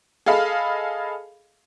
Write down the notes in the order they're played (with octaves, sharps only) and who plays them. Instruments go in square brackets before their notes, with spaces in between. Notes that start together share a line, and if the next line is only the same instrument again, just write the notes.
[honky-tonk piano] G#4 A4 D#5 F5 B5